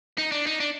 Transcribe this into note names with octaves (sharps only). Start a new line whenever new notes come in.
D#4
D4
D#4
D4